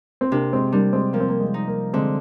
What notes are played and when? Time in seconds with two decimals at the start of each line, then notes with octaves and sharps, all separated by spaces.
0.21 C4
0.32 C3 A#3 D4
0.53 G#3 C4
0.72 G3 A#3 D4
0.93 G#3 C4
1.13 F3 A#3
1.20 C4
1.28 A#3
1.40 G#3
1.54 D#4
1.67 A#3
1.93 D3 G#3 C4